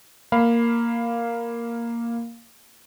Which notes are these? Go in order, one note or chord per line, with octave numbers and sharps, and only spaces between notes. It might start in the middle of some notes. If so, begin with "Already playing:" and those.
A#3 F5 B5